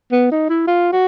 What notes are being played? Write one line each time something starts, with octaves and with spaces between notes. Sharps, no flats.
B3
D#4
E4
F4
F#4